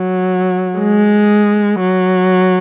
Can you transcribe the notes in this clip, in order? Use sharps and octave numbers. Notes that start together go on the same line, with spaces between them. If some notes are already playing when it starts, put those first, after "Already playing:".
Already playing: F#3
G#3
F#3